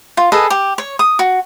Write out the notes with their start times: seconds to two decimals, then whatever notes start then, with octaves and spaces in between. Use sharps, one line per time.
0.17 F4
0.32 G#4 A4 B4 D#5
0.50 G4
0.78 C#5
0.99 D#6
1.19 F#4